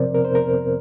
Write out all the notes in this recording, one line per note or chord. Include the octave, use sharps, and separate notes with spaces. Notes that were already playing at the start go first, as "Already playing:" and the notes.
Already playing: C3 F3 C4 A#4 C5 D5
A#4
C5
A#4